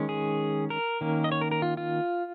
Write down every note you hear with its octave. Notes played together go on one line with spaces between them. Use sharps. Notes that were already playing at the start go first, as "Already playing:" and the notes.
Already playing: D#3 G#3 C#4
G#4
A#4
D#3 A#3 C#4
D#5
C#5
A#4
A#4
F4
F4